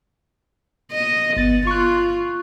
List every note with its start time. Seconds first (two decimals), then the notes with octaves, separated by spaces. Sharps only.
0.92 D#5
1.36 G1 B3 A6
1.67 F4 C#6 F#6